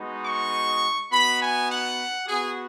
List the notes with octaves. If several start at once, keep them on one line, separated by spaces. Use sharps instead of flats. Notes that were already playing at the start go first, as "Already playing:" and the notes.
Already playing: G#3 B3 D#4 F#4
C#6
B3 D#4 F#4 B5
G#5
F#5
B3 F#4 G#4